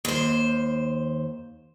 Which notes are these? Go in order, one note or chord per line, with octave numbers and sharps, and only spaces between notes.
D#2 C5